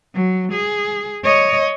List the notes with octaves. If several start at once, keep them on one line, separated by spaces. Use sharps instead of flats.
F#3
G#4
C#5 D#5